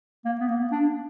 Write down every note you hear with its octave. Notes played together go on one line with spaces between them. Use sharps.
A#3
B3
A#3
D4